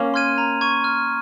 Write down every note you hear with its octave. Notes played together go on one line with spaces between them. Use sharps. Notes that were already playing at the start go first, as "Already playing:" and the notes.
Already playing: A#3 C#4
C6 F6 G#6 D#7
A#5
C#6 G#6 D#7
F6